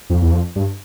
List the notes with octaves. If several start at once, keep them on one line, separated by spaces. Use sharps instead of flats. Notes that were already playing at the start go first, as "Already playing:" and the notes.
F2
E2
F2
G2